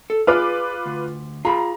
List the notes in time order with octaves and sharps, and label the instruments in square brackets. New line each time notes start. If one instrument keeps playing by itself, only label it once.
[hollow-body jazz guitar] A4
[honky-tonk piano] F4 B4 D6 [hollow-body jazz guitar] G#4 D5 F5
[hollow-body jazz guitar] D2
[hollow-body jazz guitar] F4 G#4 B5 [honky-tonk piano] A#5